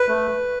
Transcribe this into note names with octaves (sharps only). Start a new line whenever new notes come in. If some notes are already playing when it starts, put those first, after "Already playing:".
Already playing: B4
A3